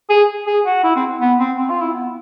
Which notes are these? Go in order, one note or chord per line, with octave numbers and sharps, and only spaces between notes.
G#4
G#4
F#4
E4
C4
B3
C4
C4
F4
E4
B3